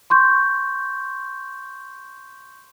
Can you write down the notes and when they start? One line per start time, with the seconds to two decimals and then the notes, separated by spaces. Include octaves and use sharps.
0.10 C6 C#6 G6